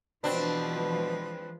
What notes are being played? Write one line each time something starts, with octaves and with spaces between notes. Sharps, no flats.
B2 E3 F3 G#3 C4 D4 B4